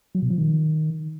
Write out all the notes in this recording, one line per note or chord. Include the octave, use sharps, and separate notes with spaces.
F#3
B2
F3
D#3